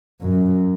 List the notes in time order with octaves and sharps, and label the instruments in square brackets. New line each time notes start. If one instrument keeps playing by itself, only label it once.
[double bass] F#2